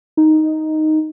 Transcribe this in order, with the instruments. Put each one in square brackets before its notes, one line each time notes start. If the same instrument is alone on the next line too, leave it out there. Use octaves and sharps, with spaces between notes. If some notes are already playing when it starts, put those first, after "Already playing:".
[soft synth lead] D#4